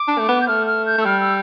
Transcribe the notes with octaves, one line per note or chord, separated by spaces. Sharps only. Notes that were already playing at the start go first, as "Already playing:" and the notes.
Already playing: D6
D4
A3
B3
G6
A3 F6
F6
G6
A3 E6
G3 F6
E6